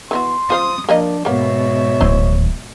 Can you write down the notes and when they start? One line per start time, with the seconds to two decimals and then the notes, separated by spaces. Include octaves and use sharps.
0.11 E3 B3 F#4 C6
0.50 F4 C5 F5 D#6
0.89 F3 A#3 D4 A#4 D#5
1.25 G#2 B2 A#3 B3 C#5 E5
2.01 D1 D#3 E4 C5 D#5